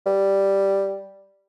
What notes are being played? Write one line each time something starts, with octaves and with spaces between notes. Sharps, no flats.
G3